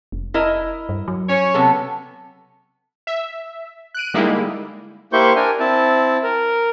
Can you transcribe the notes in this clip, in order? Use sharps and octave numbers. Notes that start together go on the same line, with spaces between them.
F1
E4 A#4 D#5
G2
F#3
C#4 C#5
C3 B3 A4
E5
F#6 D7 D#7
D3 G3 G#3 A#3 D#4 E4
A#3 E4 G4 C5 C#6 G6
D4 A#4 G#5
C4 E4 A5
A#4